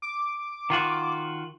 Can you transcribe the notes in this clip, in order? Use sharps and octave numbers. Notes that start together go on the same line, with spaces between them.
D6
D#3 F4 F#4